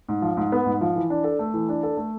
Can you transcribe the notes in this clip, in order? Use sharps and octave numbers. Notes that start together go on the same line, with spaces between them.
G#2
F3
G#2
B3
G#2
F3
E3
D4
A4
A3
E3
D4
A4
A3